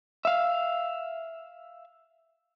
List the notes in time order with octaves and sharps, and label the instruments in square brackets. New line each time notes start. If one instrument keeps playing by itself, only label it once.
[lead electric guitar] E5 F5